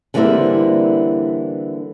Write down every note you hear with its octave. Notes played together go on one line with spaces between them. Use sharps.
D3 E3 G3 A#3 C4 E4